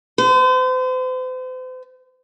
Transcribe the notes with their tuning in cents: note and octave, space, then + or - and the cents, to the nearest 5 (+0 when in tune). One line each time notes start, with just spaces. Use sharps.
C5 -40